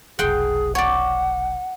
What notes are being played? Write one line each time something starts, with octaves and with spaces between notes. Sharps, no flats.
F1 B1 G#4 F#5 G5 C6
C#5 D5 F#5